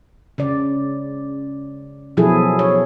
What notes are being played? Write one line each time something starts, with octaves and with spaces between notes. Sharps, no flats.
C#3 D5
B2 F3 F#3 E4 G#4 A4
C#5